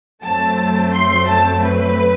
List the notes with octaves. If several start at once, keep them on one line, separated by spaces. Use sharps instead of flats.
F#2 F#3 A3 C4 A5
C6
A5
B4